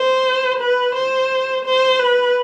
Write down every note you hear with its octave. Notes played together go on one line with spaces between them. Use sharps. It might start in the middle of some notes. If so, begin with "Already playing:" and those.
Already playing: C5
B4
C5
C5
B4